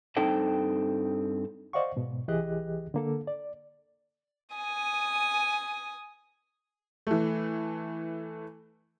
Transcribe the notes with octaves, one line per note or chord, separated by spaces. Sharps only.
G2 C4 D#4 A4 G5 A5
C5 D5 D#5 F5 F#5 C#6
G#2 B2
C2 E3 G4 G#4 D#5 F#6
D3 A#3 A4
D5
G#5 D#6
E3 A3